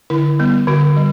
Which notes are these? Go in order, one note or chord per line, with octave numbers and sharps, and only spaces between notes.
D3 E4
G3 B3
D3 F#4
G3